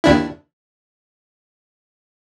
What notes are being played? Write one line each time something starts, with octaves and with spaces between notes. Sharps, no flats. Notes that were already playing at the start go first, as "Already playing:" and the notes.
D#2 D4 E4